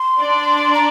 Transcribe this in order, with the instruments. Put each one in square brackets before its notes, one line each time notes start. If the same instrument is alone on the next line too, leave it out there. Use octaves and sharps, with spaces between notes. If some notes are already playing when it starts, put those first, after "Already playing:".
Already playing: [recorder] C6
[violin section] D4 D5
[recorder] A#5